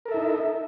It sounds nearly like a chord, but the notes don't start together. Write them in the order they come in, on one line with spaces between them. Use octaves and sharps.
A#4 A4 E5 E4 D#4